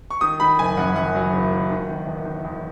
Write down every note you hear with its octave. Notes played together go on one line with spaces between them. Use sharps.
C#6
D#3 D#6
D#3 B5
F#1 G#5
F#2 F#5
F#2 F#5
F#3
F#1
D#3
D#3
D#3
E2
D#3
E2